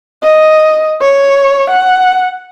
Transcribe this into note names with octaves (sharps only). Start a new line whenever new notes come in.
D#5
C#5
F#5